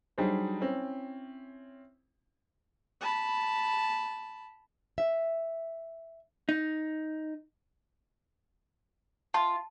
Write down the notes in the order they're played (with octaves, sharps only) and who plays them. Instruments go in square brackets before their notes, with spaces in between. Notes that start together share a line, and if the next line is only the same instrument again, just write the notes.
[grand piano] F#3 G3 D4 D#4 G#4 C5
C4 C#4 E4
[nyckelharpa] A5 B5
[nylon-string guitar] E5
[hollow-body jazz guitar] D#4
[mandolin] F4 [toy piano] A5